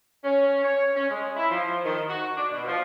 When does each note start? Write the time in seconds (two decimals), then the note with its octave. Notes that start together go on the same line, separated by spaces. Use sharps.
0.24 C#4
0.63 C#5
0.95 C#4
1.09 G#3
1.35 E4
1.49 F3
1.84 D#3
2.08 F#4
2.36 D4
2.52 B2
2.66 F3